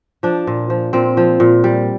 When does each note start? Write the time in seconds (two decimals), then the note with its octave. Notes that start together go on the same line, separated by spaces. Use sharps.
0.23 F3 D4
0.47 A#2
0.70 F3
0.93 A#2 C4
1.17 F3
1.40 A#2
1.64 G3